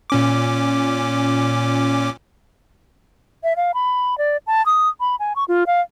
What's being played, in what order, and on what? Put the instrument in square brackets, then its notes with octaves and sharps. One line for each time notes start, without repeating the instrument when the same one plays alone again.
[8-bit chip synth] A#2 C#4 D6
[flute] E5
F5
B5
D5
A5
D#6
B5
G#5
C#6
F4
F5